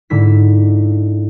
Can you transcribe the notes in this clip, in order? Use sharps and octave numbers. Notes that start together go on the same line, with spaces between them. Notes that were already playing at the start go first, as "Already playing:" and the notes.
G#2 D3 E4 B6